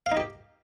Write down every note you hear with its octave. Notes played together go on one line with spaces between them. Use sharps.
F5
D#4
G4